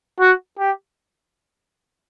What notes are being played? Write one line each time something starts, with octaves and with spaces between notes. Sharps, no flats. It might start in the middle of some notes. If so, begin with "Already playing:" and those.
F#4
G4